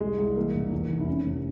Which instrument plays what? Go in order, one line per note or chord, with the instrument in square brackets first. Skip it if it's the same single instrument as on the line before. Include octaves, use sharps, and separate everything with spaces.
[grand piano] C2 G#3
C2
E3 A#3
E1
E2
F1
E4
C3 C#4
F1